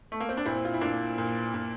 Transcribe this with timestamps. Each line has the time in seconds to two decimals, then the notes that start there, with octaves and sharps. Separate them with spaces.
0.12 A3
0.20 A#3
0.29 C4
0.37 D4
0.46 A#2 C4 E4
0.65 F4
0.74 E4
0.81 A#2 A#3 D4
1.18 A#2
1.54 A#2